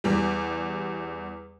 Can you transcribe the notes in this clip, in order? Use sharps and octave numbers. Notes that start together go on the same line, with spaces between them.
E2 G3